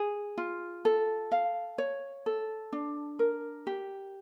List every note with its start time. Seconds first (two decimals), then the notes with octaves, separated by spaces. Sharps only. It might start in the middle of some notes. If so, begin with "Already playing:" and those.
Already playing: G#4
0.38 F4
0.85 A4
1.32 F5
1.78 C#5
2.26 A4
2.73 D4
3.19 A#4
3.67 G4